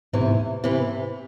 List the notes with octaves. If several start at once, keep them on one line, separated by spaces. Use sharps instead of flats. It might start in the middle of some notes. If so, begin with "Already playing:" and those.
E2 G#2 C3 E3
A2
G#2
C3 E3